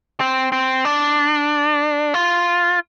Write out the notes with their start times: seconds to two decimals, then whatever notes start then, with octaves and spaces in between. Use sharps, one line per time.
0.20 C4
0.52 C4
0.85 D4
2.14 F4